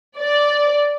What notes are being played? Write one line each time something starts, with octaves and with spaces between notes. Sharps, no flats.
D5